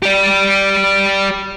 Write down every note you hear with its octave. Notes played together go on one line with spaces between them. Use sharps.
G4 D5